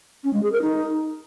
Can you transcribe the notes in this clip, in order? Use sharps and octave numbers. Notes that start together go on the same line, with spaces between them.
C#4
G#3
G#4
A#4
D#4